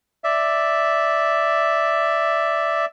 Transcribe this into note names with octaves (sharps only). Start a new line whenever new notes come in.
D5 E5